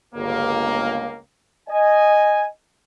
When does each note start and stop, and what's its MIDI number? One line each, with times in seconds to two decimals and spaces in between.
0.15 1.19 31
0.15 1.19 37
0.15 1.19 58
1.69 2.46 75
1.69 2.46 80